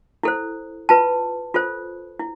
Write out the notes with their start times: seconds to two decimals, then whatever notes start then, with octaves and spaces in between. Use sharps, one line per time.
0.23 E4 A4 C5
0.89 F4 B4 A5
1.54 F4 A4 C5
2.19 E4